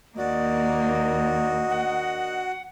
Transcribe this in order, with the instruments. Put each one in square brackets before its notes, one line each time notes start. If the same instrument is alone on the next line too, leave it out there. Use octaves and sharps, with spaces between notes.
[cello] D#2 A#3 [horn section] D4 A#4 D#5 [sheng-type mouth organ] F#4 [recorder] D5
[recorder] F#5